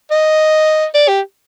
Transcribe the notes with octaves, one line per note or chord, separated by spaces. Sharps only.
D#5
D5
G4